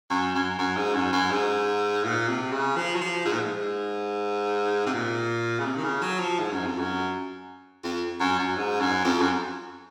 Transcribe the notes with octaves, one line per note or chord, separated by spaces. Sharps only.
F#2
F#2
F#2
G#2
F#2
F#2
G#2
A#2
C3
C#3
F3
F#3
F3
G#2
A#2
G#2
C3
A#2
C#3
C3
D#3
C#3
F#3
F3
G#2
F#2
F2
F#2
F2
F#2
F#2
G#2
F#2
F2
F#2